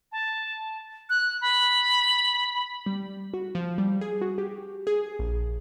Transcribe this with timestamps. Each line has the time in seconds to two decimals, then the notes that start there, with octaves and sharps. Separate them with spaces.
0.12 A5
1.10 F#6
1.41 B5
2.86 G3
3.34 F#4
3.55 F3
3.78 G3
4.01 G#4
4.22 F#4
4.38 G4
4.87 G#4
5.19 A#1